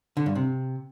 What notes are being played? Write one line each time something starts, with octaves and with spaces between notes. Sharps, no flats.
D3
G2
C3